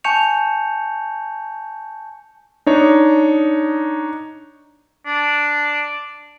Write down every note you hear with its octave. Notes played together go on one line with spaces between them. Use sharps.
G#5 A5 C#6 G6 C#7 F7
D4 D#4 C#5
D4